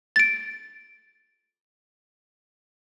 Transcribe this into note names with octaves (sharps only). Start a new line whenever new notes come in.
A6 D7